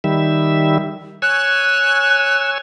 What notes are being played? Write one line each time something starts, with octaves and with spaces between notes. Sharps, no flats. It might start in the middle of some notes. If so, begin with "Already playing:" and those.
D#3 G3 E5
C#5 G#5 E6 F#6